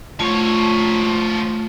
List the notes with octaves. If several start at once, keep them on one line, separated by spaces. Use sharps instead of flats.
F3 A3 F4 C#5